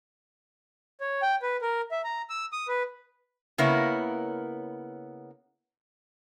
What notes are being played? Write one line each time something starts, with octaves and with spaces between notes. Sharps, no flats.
C#5
G5
B4
A#4
E5
A#5
E6
D#6
B4
C#3 A#3 B3 E4 A#4 C#5